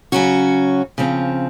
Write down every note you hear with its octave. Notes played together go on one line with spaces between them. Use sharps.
C#3 F#3 C#4 F#4
C#3 F3 C4